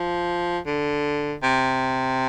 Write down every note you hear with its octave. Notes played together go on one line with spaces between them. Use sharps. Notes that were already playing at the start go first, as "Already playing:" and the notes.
Already playing: F3
D3
C3